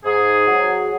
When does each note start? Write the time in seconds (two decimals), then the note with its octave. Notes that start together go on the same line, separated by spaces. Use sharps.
0.05 G#2 G#4
0.47 F#3